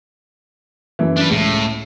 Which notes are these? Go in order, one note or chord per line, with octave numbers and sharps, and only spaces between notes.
F#2 E3
D4 B4
C#2 A2